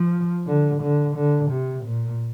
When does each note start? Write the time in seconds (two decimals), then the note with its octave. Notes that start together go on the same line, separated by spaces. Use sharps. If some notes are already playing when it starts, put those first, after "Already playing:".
Already playing: F3
0.46 D3
0.81 D3
1.16 D3
1.50 C3
1.84 A#2